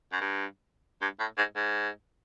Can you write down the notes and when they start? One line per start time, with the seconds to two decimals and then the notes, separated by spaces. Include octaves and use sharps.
0.12 F#2
0.21 G2
1.01 G2
1.19 A2
1.38 G#2
1.56 G#2